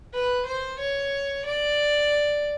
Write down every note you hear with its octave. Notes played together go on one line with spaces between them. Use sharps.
B4
C5
C#5
D5